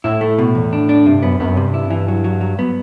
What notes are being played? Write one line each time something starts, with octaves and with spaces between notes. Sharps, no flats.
A2 E4
A3
B2
E2
D4
D4
G2 C3
F#2 B3
F#2 B3
G2 C3
E4
E3
F#3
F#3
F#3
B3